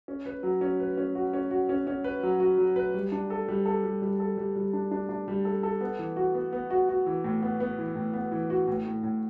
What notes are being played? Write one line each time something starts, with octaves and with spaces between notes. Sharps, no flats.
C#4
B4
F#3
C#4
B4
C#4
F#4
C#4
F#4
C#4
C#4
B4
F#3
F#4
F#3
B4
G3
D4
A4
G3
A4
G3
G3
A4
G3
G3
D4
D4
D4
G3
A4
A4
B3
E3
F#4
B3
B3
F#4
F#4
E3
A2
B3
B3
E3
A2
B3
E3
F#4
A2
A2
A2